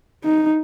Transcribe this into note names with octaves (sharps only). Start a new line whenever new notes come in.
D#4